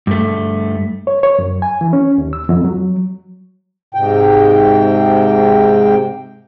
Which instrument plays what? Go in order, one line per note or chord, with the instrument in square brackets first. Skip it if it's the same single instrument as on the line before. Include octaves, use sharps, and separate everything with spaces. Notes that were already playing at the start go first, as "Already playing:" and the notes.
[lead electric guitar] G2 A3
[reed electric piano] C#5
C#5
F#2
G#5
E3
C#4
D#2
E6
F2
F#3
[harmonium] G#2 C3 G5